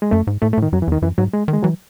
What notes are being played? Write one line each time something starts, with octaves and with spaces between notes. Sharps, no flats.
G#3
F#2 A3
G#2
A2 A3
A3
A2 D#3
F#2 F#3
E3
E2 D#3
F#2 E3
G#2 F#3
G#3
D#3
G#3
E3 F#3